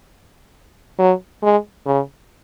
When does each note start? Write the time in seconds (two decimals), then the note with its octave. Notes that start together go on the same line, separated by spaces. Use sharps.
0.99 F#3
1.43 G#3
1.86 C#3